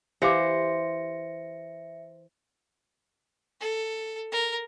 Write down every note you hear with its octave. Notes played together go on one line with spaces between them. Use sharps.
E3 G4 C5 E5 F5 D6 A#6 C#7
A4
A#4